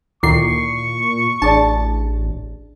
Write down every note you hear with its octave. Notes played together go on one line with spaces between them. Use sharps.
D2 A#2 D#3 E4 C#6 D6 C7
A1 D4 G#4 D5 A5